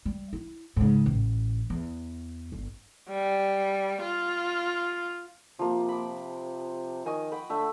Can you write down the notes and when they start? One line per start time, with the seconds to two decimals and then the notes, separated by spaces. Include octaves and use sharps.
0.05 G3
0.33 E4
0.76 G#2 C#3
1.06 A1
1.70 E2
2.52 G1
3.10 G3
4.02 F4
5.59 C3 F3 A#3
5.89 B5 D6
7.06 D#3 D#5 G#5 C#6
7.32 F#5 G5 B5
7.50 D3 A3 E5